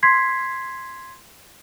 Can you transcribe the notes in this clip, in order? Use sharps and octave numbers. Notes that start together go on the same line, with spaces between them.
C6 G#6 B6 C7